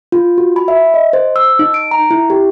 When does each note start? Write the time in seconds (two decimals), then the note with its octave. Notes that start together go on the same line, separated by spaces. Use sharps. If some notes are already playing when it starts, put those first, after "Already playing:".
0.12 F4
0.38 F#4
0.56 B5
0.68 E5
0.94 D#5
1.13 C5
1.36 E6
1.59 D#4
1.74 D7
1.91 A#5
2.11 E4
2.30 G4